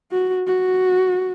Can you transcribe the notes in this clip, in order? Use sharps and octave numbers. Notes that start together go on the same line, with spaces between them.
F#4
F#4